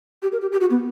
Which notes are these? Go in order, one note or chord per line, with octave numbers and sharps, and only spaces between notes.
G4
A#4
G4
G4
F#4
B3